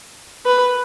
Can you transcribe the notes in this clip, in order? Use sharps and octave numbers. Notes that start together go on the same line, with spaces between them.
B4